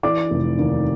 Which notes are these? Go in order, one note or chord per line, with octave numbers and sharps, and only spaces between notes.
E3 D5 D6
F1
D#2